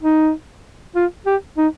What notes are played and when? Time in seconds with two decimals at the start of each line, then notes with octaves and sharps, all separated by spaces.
0.03 D#4
0.96 F4
1.26 G4
1.58 D#4